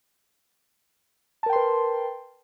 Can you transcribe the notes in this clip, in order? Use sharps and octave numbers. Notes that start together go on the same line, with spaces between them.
A#4 B4 G5 A5 C6